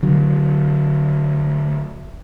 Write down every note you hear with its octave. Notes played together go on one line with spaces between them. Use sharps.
D3 F#3